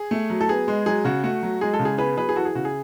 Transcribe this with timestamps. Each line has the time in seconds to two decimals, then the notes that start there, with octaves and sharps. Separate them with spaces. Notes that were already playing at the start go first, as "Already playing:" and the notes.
Already playing: G#4
0.11 A3
0.30 F#3
0.41 A4
0.49 B3 G#4
0.68 G#3
0.86 F#3 G#4
1.05 C#3 F#4
1.23 A3 F#4
1.43 F#3
1.61 G#3 G#4
1.74 A4
1.79 C#3
1.85 G#4
1.98 B3 G#4 B4
2.17 F#3 G#4 B4
2.29 G#4
2.36 E3 F#4 A4
2.45 G#4
2.55 C#3 F#4
2.65 G#4